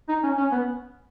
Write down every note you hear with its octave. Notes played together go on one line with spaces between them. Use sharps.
D#4
C#4
C#4
B3